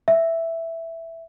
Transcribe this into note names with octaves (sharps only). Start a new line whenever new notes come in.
E5